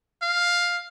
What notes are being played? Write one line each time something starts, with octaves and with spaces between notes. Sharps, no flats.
F5